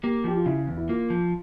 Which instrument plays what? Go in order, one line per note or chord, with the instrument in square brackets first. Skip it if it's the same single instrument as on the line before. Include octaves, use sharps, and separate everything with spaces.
[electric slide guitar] A#3 [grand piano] G4
[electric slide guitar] F3 [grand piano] G4
[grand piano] F4
[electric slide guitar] C#3 [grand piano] E4
[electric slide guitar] E2
[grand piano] E4
[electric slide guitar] A#3 [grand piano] F4
[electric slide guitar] F3